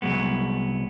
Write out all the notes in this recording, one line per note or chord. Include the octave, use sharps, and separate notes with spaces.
C2 G2 F#3 G#3 B3